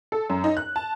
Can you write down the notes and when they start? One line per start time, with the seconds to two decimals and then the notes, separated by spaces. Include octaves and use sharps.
0.12 A4
0.30 F#2
0.44 D#4
0.57 F#6
0.76 A5